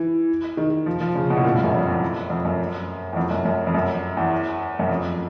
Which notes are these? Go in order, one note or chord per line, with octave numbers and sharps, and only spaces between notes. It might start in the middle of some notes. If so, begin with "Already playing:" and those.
Already playing: E3
D#3
F3
F3
C#3
B2
A2
A#2
G2
F#2
F2
E2
F2
F#2
E2
F2
F#2
F#2
F2
F#2
E2
F#2
F2